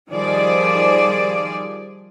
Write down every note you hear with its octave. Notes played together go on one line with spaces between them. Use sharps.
D#3 F3 G3 G#4 D5